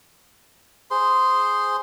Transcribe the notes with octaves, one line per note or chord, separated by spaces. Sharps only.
G#4 C5 C6